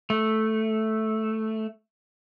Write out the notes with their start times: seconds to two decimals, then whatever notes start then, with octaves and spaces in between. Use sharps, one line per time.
0.10 A3